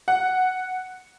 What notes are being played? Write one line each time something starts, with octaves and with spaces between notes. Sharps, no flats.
F#5